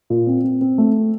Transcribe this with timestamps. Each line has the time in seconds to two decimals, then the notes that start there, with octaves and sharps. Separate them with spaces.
0.10 A#2
0.27 C4
0.44 C4
0.61 C4
0.78 A3